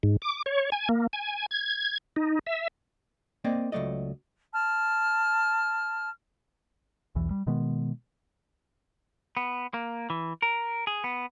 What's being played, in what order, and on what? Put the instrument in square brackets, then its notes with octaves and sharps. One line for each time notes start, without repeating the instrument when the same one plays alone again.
[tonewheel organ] G#2
D6
C#5
G#5
A#3
G#5
G#6
D#4
E5
[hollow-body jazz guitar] A#3 C4 D5 D#5
C#2 F#3 A3 D5 D#5
[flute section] A5 F6
[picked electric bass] B1 E2 E3
G3
B2 D#3 G#3 B3
[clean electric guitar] B3
A#3
E3
A#4
G#4
B3